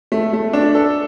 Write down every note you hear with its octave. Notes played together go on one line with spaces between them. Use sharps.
A3
A3
D4
A4